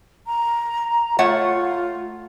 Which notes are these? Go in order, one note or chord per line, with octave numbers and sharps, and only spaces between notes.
A#5
A3 F4 C#5 F#5